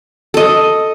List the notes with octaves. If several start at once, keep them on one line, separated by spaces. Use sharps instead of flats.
A4 D#5